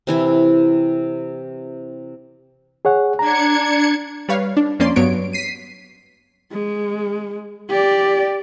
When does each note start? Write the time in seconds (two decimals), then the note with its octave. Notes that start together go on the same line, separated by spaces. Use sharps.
0.07 C3 E3 E4
2.85 G#4 C#5 F#5
3.19 D4 A#5 G#6 C#7
4.28 G3 B4 C#5 F5
4.57 D4
4.79 F2 A#3 C#4 D5 C6
4.96 G2 F#3 B3 C#5 D7
5.33 B6 C7 D#7
6.52 G#3
7.69 G4 D5